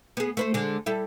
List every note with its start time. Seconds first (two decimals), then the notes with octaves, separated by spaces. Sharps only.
0.17 B3 G#4
0.37 A3 B4 C5
0.54 D3 G#3
0.86 G3 E4 A4